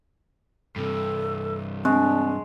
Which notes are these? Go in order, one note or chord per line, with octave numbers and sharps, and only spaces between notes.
G2 C3 A4
G#3 C4 D4